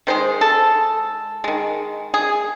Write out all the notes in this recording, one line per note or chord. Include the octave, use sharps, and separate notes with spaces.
D#3 G#3 C5
A4
D#3 G#3
G#4